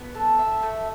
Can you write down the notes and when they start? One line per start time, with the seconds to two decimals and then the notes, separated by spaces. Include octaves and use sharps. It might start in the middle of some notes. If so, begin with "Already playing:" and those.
Already playing: B3
0.15 A4
0.39 E5
0.63 A3